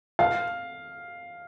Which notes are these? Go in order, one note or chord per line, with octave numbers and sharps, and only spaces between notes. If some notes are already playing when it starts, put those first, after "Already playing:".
F5